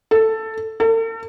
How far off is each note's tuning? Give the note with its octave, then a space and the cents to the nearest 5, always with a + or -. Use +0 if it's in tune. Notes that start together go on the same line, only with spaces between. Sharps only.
A4 +10
A4 +45